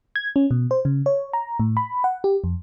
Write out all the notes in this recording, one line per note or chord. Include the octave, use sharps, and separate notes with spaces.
G#6
C#4
B2
C5
C#3
C#5
A#5
A2
B5
F#5
G4
F2